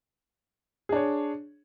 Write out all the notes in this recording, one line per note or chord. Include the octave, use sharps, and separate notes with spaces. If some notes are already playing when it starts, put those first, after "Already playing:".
D4 G#4 C#5